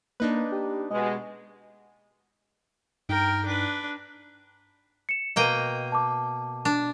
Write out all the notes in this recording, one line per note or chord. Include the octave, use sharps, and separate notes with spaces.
A#3 D4 D#4 B4
G4
B2 G#3 D#5
G2 D#4 A#4 G5
D4 B4
C#7 E7
B2 A#3 D#5 G5 D#7
A5 D6
D4